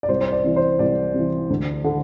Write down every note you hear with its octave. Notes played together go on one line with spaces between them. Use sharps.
D5
C2 C5
C5
D5
C3 E3
C5
C2 D5
C3 E3
D2
D3